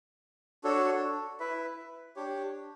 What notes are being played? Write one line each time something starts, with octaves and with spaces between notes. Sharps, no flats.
D4 F#4 A4 C#5
E4 B4 E5
D4 G4 C#5